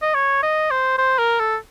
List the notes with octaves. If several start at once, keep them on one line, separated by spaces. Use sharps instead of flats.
D#5
C#5
D#5
C5
C5
A#4
A4